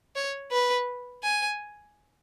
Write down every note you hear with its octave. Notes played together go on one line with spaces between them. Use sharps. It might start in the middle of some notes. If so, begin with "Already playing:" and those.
C#5
B4
G#5